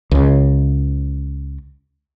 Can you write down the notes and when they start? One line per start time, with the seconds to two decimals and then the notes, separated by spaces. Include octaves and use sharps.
0.11 C#2 C#3